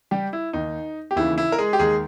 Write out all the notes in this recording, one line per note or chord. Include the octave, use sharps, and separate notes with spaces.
G3 G4
E4
D#2 D#3 D#4
G4
D#2 C#3 E3 E4
E4
A#4
G#3 G#4
G4
D#2 D#3 G#3 G#4